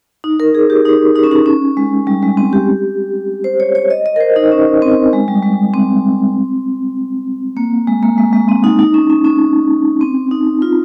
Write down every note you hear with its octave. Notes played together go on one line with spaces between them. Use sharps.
D#4
A#4
G#4
G4
D#4
D#4
C#4
D#4
C#4
G#3
G3
G#3
C4
G4
C5
C#5
C#5
D#5
D#5
A#4
C5
D#4
C#4
C4
G#3
G3
G#3
C4
A#3
G#3
A#3
G#3
G#3
C4
D#4
D#4
C#4
C#4
C#4
C4
D#4
F4